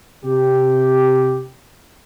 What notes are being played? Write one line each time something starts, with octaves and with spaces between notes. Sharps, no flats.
C3 G4